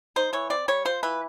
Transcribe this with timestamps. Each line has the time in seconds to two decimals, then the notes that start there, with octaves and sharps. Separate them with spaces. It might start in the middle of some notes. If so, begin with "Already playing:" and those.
0.16 D#4 C5
0.33 E3 C#5
0.50 C4 D5
0.68 G3 C#5
0.85 F4 C5
1.03 E3 B4